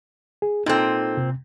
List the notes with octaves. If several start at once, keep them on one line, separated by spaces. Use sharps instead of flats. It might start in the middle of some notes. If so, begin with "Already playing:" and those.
G#4
A#2 C4 D#4 A4
C3